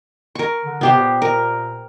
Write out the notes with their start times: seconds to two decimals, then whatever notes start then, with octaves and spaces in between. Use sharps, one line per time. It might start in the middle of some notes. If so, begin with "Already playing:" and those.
0.35 A#4 C#6
0.65 D3
0.81 C3 B3 G4 C5
0.97 A#2
1.22 A#4